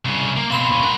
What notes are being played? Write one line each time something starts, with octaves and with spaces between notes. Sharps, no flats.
C2 C#3
A#3
B2 C4 F5 B5 C6
A#2 C#4
A#4 F#5